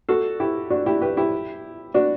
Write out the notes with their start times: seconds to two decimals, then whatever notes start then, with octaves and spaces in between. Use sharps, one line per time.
0.09 F#4 A4
0.40 E4 G4
0.70 D4 F#4
0.86 E4 G4
1.02 G4 B4
1.17 E4 G4
1.94 D4 F#4